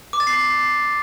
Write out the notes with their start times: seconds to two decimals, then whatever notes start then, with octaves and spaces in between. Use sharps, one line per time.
0.13 D6
0.20 A6
0.27 C7